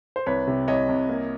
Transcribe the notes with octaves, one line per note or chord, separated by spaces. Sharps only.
C5
C2 B4 C#5
C3
C2 C#5 D#5
C2
A#3